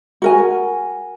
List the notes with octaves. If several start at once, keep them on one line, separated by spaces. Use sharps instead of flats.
F#4 A#4 G#5